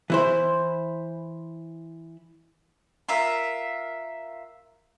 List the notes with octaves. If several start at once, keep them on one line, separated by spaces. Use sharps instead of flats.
E3 E4 C5
F4 A#4 E5